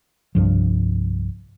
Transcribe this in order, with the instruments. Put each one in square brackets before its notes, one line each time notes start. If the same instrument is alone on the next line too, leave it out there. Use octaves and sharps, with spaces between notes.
[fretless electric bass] C2 G2 F3